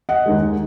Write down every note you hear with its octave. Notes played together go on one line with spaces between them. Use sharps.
D#5 F#5
D#2 D#3 G#3